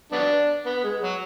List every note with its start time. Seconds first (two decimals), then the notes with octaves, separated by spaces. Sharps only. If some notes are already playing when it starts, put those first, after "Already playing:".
0.12 F#3 B3 D4
0.66 B3
0.83 G#3
1.01 F#3